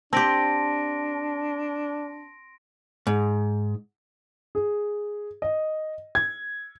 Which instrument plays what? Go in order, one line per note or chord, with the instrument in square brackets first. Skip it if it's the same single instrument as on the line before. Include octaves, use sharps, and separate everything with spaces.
[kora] C4 G4 [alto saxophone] D4 [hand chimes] A5 [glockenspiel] C6 A#6 D7
[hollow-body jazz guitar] G#2
[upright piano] G#4
D#5
G#6